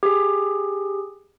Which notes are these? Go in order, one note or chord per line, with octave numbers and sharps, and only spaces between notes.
G4 G#4